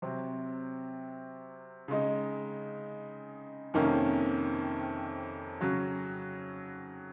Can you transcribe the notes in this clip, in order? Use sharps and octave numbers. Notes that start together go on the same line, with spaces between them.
C3 F#3 C4
C#3 G#3 D#4
F2 C3 D#3 A#3 C#4
C#3 F#3 C#4 F#4